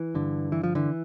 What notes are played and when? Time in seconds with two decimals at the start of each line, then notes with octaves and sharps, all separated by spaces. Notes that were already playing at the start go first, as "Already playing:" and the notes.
Already playing: E3
0.15 G2 D3
0.52 E3
0.63 F3
0.75 D3 E3